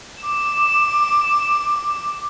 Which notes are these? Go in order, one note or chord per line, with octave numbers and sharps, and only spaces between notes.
D6 E7